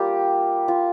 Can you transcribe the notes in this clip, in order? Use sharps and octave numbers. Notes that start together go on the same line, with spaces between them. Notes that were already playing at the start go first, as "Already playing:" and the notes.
Already playing: G3 A#3 F4 G4
F4